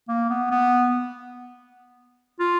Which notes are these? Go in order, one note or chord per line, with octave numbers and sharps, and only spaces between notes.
A#3
B3
B3
F4